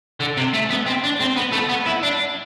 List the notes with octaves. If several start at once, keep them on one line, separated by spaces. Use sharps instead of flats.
D3
C3
A3
B3
C4
D4
C4
B3
A3
B3
E4
D4